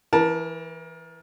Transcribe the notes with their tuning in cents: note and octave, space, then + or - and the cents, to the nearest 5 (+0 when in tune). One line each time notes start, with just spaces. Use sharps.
E3 +0 A#4 +30 A5 +0